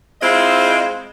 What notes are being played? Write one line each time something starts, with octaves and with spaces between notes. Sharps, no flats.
G#3 C4 E4 F4 D#5